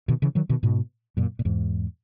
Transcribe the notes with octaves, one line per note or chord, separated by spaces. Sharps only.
B2 D#3
C#3 E3
D#3 F#3
B2 D#3
G#2 B2
F#2 A#2
A#2
E2 G#2